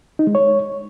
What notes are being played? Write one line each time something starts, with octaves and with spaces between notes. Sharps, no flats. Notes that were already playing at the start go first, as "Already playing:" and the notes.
D#4
G#3
C#5